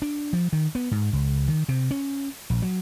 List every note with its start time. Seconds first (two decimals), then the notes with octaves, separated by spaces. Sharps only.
0.02 D4
0.33 F3
0.53 D#3
0.75 B3
0.91 G#2
1.13 C#2
1.48 D#3
1.69 C3
1.91 C#4
2.50 A#1
2.62 F#3